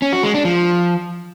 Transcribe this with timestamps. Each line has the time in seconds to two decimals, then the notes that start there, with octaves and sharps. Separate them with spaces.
0.02 C#4
0.13 F#4
0.23 G#3
0.34 D4
0.45 F3